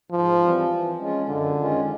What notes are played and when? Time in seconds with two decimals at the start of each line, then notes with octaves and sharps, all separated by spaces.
0.11 G#2 F3
0.41 E3 G3 C4
0.69 E3
0.98 G#3 C#4 F4
1.28 F#2 D3
1.57 D#3 G#3 C#4 F4